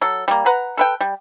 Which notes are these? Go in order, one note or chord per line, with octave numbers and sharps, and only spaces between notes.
F#3 A4
G3 A#3
B4 F#5 A#5
A4 B4 G5
G3